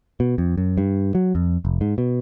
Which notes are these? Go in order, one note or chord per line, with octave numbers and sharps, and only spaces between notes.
B2
F2
F#2
G2
F#3
F2
F1
G#2
B2